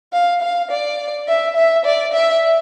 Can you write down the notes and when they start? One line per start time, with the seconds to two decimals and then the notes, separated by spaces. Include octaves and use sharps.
0.13 F5
0.42 F5
0.71 D5
1.28 E5
1.56 E5
1.85 D5
2.13 E5